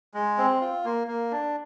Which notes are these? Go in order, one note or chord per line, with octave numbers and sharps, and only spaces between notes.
G#3
C4
F4
A#3
A#3
D4